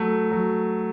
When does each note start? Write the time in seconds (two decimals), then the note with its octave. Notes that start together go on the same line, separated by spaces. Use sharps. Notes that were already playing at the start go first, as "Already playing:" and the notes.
Already playing: F#3 A3
0.31 F#3